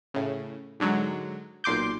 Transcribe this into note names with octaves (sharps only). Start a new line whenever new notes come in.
A2 C#3
G#2 D3 F#3 G#3
B1 A#2 C6 D6 G6